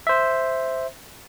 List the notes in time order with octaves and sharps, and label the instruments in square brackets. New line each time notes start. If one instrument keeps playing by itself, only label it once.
[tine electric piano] C5 E5